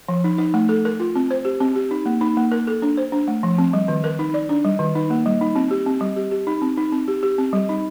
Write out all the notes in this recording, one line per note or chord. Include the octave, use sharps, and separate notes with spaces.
F3
D#4
D#4
A3
A4
A#4
F4
C4
C5
G4
C4
G4
D#4
A#3
D#4
A#3
A#4
A4
D4
C5
D4
A3
F3
C4
G3
D#3
A#4
D#4
D5
D4
G3
D#3
D#4
A#3
G3
D#4
C4
G4
C4
G3
G4
G4
D#4
C4
D#4
C4
G4
G4
C4
G3
D#4